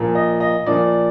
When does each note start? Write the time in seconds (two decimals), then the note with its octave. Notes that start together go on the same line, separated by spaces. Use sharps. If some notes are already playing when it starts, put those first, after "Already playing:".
Already playing: A#2 F3
0.15 D#5
0.40 D#5
0.66 A#2 F3 D5